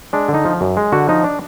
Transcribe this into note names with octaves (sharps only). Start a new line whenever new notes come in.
G#3 D4
D3
D#4
F3
F#2
G#3
D3 F#4
F3 D#4
D4